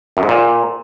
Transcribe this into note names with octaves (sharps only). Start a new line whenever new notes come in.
F#2
G#2
A#2